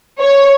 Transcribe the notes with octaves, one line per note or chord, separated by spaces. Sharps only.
C#5